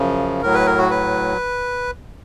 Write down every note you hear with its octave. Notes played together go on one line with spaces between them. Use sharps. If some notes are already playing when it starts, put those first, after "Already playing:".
Already playing: F#2 C#3 F3
A2 F#3 A#4
B4
A#4
F#4
B4